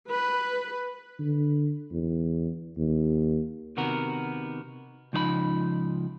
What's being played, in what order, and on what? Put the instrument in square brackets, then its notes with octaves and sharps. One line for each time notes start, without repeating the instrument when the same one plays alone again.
[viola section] B4
[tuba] D3
E2
D#2
[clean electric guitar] C3 D#3 B3 F#4 A#4
C#2 F3 D#4 D5 B5